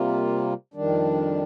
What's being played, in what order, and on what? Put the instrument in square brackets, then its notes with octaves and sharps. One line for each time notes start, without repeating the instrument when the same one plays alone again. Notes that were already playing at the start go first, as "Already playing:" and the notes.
Already playing: [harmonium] C3 G3 A#3 F4
F2 D#3 G3 D4